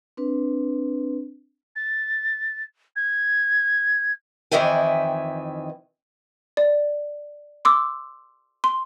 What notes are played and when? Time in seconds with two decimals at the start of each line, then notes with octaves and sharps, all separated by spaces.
0.17 C4 D4 B4
1.76 A6
2.96 G#6
4.52 F2 D#3 E3 E5 G5 G#5
6.57 D5
7.65 C6 D6 E6
8.64 C6